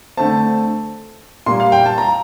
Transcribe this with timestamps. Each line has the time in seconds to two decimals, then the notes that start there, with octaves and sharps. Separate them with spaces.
0.17 D3 A3 C4 A5
1.46 A#2 G3 A#3 C6
1.60 F5
1.72 G5
1.86 A5
1.98 A#5